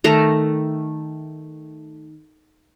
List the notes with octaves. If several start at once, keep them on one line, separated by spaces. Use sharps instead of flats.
D#3 A3 A#5